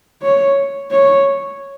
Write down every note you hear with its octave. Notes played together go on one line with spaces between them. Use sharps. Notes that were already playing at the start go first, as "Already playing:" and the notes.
C#5
C#5